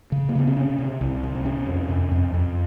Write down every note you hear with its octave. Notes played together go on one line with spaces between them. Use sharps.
C#3
A#3
C#3 B3
C4
C3 C#4
C3
C2
C3
C4
C3 C#4
F2
F2
F2
F2